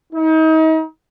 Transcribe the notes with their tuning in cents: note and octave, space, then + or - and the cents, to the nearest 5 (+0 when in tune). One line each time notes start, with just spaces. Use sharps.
D#4 +35